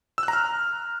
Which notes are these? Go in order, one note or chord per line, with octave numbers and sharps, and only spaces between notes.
E6
F#6
A#5
F6